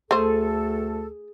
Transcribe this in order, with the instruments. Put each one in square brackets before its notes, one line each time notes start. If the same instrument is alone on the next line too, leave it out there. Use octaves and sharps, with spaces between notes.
[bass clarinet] D2 [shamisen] A3 C5 [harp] G#4 [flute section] A4